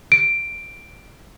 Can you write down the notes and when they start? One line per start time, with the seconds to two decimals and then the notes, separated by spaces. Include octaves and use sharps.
0.12 D7